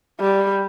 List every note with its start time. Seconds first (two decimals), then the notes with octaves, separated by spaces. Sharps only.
0.20 G3